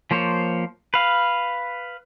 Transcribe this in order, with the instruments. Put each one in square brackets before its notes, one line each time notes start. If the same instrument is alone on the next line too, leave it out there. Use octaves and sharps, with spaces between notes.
[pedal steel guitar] F3 A#3 C5 C#5
B4 F5